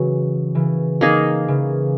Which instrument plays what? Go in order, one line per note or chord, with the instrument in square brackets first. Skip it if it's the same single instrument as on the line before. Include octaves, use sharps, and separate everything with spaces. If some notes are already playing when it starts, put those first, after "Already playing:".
Already playing: [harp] C#3 E3 [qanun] F#3
[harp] C#3 E3
[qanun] A#3 D#4 G#4
[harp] C#3 E3